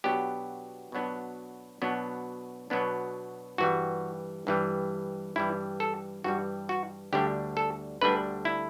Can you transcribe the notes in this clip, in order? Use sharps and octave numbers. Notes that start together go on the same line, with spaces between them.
B2 F#3 B3 D4 G4
B2 F#3 B3 D4
B2 F#3 B3 D4
B2 F#3 B3 D4
G2 E3 G3 F#4
G2 E3 G3
G2 E3 G3 E4
A4
G2 E3 G3 F#4
F#4
D2 D3 G3 D4 G4
A4
D2 D3 G3 D4 B4
E4